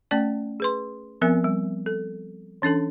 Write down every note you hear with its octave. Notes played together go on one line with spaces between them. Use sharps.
A3 C#4 D5 G5 A5
G#4 B4 C6
F3 B3 C4 A#4 E5
G3
A4
E3 C#4 D4 A4 A5